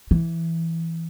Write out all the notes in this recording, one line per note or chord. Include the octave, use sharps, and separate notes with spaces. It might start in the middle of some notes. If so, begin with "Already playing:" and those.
E3